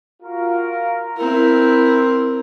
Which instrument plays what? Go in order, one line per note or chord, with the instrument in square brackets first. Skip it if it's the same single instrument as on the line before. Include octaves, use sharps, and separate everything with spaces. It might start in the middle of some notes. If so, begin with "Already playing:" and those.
[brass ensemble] F4 F#4 A#4
[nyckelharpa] C4 A#4 [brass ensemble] E4